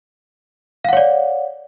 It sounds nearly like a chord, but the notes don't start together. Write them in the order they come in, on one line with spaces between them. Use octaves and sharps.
F5 F#5 C#5 D5